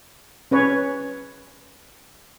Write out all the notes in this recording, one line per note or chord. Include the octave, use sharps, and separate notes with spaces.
C#4 B4 C#5